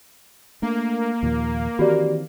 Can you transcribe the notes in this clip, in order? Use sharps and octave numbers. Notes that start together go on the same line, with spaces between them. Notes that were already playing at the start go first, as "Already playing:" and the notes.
A3 A#3 D4
D#2 A#2 F3
D#3 E3 C4 F#4 G4 D5